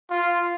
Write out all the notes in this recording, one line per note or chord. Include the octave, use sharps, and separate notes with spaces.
F4